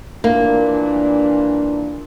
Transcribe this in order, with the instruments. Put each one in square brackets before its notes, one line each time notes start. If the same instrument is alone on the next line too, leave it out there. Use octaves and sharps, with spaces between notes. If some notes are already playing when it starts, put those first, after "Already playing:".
[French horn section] A#2 E3 D4 [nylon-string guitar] A#3